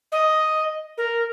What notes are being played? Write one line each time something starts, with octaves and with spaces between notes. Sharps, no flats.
D#5
A#4